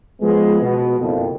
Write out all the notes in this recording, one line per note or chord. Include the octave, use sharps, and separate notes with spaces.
F3 G#3 B3
B2
F#1 F2